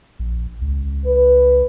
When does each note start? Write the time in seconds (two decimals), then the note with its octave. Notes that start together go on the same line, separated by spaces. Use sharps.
0.19 A#1
0.62 C#2
1.06 B4